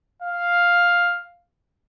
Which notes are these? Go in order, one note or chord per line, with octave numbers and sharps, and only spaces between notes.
F5